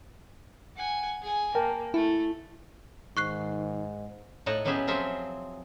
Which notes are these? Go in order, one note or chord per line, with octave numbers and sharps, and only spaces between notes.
F#5 G#5
G#4 G#5
A#3 A#4 G5 A5
A3 E4
G#2 D#3 C#6 F#6 C7
A2 D#4 C#5 D#5 F#5 A5
F#3 B3 C#4 G4 G#4 E5
F3 F#3 C4 F4 G#4 E5